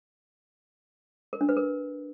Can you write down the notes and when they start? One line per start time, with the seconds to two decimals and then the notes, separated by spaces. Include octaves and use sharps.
1.33 A#4
1.41 D4
1.49 B4
1.57 A#4